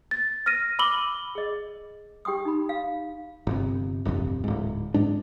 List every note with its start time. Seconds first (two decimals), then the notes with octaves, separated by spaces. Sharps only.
0.11 A6
0.46 F6 A#6 D#7
0.79 B5 D6 E6 F#7 G7
1.35 G#4 D#5
2.25 G4 G5 C6 D#6
2.45 D#4 B5
2.69 F5
3.47 G1 C3
4.05 D1 G1 F2 C3
4.44 D1 G#2
4.94 G#2 G#3 D4